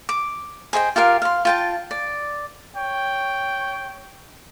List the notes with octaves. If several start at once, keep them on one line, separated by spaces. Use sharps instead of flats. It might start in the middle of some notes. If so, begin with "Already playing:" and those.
D6
G#4 C5 D#5 G5
F4 G4 A#4 F5
F5 C6
F4 G5 A5
D5
C#5 G5